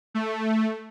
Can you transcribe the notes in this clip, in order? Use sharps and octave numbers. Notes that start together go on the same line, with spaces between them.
A3